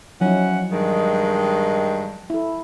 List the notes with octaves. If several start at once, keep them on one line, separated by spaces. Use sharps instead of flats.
F3 F#3 C#4 D#4 E4 F#5
G2 D#3 G#3
E4 A4